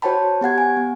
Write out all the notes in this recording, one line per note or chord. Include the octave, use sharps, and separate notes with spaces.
F#4 C5 C#5 G5 A5 B5
B3 G4 F#5 G#6
G#5
B3